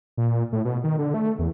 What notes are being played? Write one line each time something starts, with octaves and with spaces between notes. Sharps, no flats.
A#2
A2
B2
D#3
D3
A3
E2